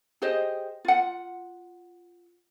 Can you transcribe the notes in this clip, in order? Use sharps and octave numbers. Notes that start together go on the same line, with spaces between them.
G4 G#4 C5 D#5
F4 F#5